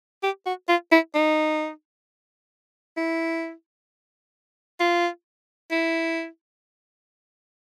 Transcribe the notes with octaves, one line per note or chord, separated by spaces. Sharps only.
G4
F#4
F4
E4
D#4
E4
F4
E4